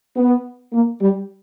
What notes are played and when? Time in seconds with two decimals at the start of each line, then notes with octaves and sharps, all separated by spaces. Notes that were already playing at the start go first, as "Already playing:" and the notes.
0.16 B3
0.73 A#3
1.00 G3